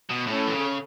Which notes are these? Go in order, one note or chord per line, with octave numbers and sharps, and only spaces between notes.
B2
A2 C#4 A4 C#5
E3
C#3